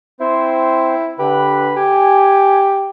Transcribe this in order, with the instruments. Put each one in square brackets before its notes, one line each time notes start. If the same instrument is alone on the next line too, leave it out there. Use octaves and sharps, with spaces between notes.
[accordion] C4 C5 [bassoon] E4
[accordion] D3 B4 B5 [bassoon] G4
[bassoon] G4 [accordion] G#5